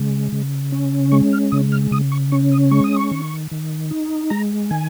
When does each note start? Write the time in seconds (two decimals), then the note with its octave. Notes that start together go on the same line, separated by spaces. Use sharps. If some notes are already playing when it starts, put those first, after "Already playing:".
Already playing: C#3 G#3
0.32 C#3
0.72 C#4
1.12 G#3 C#6
1.32 F6
1.52 C#3 D#6
1.72 F6
1.91 C#3 D#6
2.12 C#6
2.32 C#4 C#6
2.51 D#6
2.71 G#3 C#6
2.84 D#6
2.96 C#6
3.11 D#3
3.51 D#3
3.91 D#4
4.30 G#3 A#5
4.70 D#3 G#5